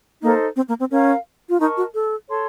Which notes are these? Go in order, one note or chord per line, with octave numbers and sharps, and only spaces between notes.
A#3 D#4 A4 C5
C4
A#3
C4
C#4 A#4 F5 A#5
F4
D#4 A#4 D#5 A5 C#6
F#4
A4
A4 C#5 A5 C6